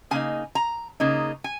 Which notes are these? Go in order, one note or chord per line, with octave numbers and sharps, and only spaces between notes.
C#3 A#3 D#4 G#5
A#5
C#3 A#3 D#4
G#5